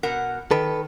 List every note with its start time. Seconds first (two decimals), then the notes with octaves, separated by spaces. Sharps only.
0.03 B2 A#4 F#5
0.51 D#3 A4 B4